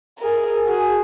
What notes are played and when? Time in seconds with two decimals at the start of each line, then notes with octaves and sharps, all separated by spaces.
0.19 G#4 A#4
0.67 F#4 G#4